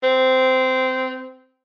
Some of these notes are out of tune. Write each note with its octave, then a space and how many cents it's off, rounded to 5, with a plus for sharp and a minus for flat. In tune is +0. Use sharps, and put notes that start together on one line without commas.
C4 -15